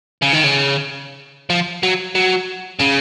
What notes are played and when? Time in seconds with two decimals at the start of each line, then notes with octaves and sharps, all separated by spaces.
0.22 C#3
0.33 D#3
0.44 C#3
1.50 F3
1.83 F#3
2.15 F#3
2.79 C#3